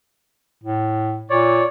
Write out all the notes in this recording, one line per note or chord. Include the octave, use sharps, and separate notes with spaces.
A2
A#2 C#5 D5